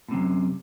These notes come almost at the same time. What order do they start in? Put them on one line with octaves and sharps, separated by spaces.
A2 C3 F#2